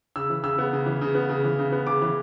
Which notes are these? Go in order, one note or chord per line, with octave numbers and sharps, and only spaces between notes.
C#3 E6
E3
C#3 E6
B3
C#3
E3
C#3
B3
C#3
E3
C#3
B3
C#3 D6
E3